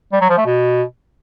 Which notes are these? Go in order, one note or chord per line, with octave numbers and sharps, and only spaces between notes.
G3
F#3
F3
A3
B2